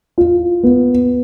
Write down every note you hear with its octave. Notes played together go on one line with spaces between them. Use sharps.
F4
B3